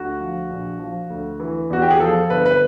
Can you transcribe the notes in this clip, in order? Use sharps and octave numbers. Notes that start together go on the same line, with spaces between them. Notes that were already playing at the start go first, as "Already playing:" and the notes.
Already playing: D2 F#4
F3
A#1
F3
D2
E3
E2 F#4
G4
G#4
F3 A4
G1 B4
B4